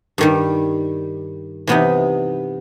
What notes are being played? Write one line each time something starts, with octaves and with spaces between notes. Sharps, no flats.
G2 D#3 G3
C3 E3 B3 D#4